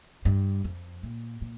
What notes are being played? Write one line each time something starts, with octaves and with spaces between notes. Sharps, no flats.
G2
F2
A#2
A#2